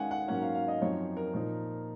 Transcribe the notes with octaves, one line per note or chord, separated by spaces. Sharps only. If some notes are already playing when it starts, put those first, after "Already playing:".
Already playing: D#3 G#3 C#4 F5 F#5 G#5
F#5
G#2 F#3 A#3 C#4 F#5
F5
F5
D#5
F#2 F3 C4 D#4 C#5
A#4
A#2 F3 A#3 D#4